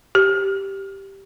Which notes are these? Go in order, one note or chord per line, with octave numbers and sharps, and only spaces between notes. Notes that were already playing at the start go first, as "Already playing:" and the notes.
G4